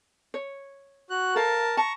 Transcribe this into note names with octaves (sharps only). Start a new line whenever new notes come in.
C#5
F#4 F#6
A4 A#4 C5 F5 A5
A5 A#5 C#6